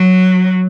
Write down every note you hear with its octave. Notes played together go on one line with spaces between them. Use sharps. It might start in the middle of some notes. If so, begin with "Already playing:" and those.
Already playing: F#3